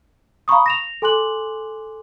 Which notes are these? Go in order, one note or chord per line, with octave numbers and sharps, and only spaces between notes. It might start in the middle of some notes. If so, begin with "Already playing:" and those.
F5 A#5 B5 C#6 D#6
A#6 E7 F7
A4 G#5 C6 D6 F#6 F#7